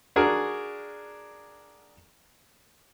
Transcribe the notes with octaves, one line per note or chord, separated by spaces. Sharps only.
D4 F#4 G#4 A#4